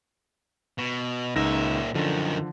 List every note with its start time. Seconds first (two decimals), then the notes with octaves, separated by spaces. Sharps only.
0.78 B2
1.36 C#2 A#2 D#4 E5 A#6
1.94 F#2 D3 D#3 F3